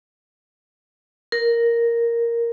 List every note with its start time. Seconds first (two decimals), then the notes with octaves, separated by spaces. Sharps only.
1.32 A#4